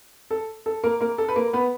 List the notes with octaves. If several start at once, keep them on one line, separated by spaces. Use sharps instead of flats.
A4
A4
A#3 A#4
A#3 A#4
A4
B4
A#3 A#4
B3 B4